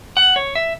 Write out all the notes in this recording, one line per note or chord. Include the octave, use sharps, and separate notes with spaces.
F#5
C#5
E5